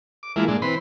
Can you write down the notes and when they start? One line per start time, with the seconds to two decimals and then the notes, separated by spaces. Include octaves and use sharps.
0.23 D6
0.36 E3 F3 G#3 A#3 E4
0.48 A#2 G#3 D4
0.62 E3 C4 B4 B5 C6